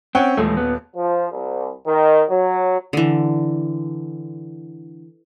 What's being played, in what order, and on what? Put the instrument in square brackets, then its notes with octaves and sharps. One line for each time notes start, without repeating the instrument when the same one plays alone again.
[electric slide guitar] C4 [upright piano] C#4 F#5 G5
[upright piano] D#1 [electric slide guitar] E2 G#3 A3
[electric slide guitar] B3
[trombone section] F3
C2
D#3
F#3
[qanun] D3 E3